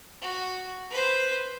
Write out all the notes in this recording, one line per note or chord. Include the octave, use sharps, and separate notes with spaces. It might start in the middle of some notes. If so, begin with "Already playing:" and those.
F#4
B4 C5